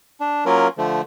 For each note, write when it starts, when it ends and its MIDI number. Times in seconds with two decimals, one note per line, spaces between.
0.20 0.44 62
0.46 0.68 54
0.46 0.68 58
0.46 0.68 61
0.46 0.68 65
0.46 0.68 70
0.78 1.01 50
0.78 1.01 53
0.78 1.01 57